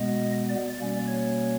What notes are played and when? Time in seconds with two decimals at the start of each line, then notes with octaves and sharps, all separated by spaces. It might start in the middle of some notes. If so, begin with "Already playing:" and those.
Already playing: B2 G#3 B3 D#5
0.49 D5
0.78 B2 G3 A#3 C#4 D5
1.08 C#5